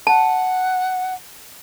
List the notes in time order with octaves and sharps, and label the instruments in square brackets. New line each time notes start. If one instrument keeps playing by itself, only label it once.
[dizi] F#5 [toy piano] A5